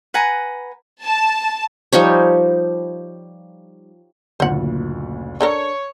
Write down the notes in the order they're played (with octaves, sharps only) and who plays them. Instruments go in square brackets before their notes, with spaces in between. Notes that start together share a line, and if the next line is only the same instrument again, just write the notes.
[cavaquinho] B4 F#5 G#5 A#5
[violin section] A5
[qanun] F3 G3 D#4 C#5
[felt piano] F#1 D2 A#2 [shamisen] C5 F#5
[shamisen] D4 A4 A#4 [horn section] C#5